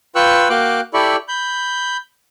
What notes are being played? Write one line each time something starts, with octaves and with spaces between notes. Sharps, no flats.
F4 B4 G5 C#6 E6 F#6
A#3 F#4 F5 G5 D6 F#6
E4 G4 A4 D5 B5 C#6
B5 G6